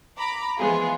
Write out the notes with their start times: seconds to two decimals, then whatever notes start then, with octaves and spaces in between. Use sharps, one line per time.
0.17 A#5 B5 D6
0.58 E3 F3 G#3 B3 F4 G#4